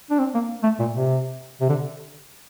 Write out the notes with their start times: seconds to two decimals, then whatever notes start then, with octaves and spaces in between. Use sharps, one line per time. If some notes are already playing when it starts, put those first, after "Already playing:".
0.10 D4
0.19 C4
0.34 A#3
0.63 A3
0.79 A#2
0.94 C3
1.61 C3
1.69 D3